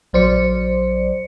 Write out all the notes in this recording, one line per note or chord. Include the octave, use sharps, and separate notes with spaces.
A#1 F#3 C5 D5 C#7